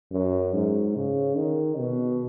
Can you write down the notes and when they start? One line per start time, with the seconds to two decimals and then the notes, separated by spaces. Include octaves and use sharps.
0.12 F#2
0.53 G#2
0.95 C#3
1.37 D#3
1.78 B2